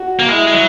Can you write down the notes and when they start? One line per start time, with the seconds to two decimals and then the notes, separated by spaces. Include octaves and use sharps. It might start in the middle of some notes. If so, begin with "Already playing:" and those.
Already playing: F#4
0.19 A#3
0.29 G#3 E4
0.47 G#3
0.53 F#3